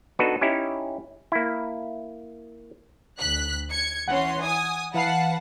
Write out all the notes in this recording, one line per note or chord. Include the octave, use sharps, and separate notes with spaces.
B3 D4 D#4 F#4 A4 B4
C#4 D#4 E4 G4
A#3 E4
D2 F#6 B6
G#6 C#7
E3 C#4 F#5 C6
G#5 D#6
E3 B4 F5 F#5 A5 C7